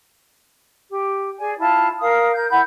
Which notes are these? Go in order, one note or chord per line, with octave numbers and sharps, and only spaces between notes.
G4
G#4 D5 G#5
E4 F4 A5
A#4 F5 D#6
A#4 G6
E4 F#5 B5 G6